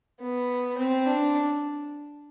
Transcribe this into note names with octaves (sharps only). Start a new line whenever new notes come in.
B3
C4
D4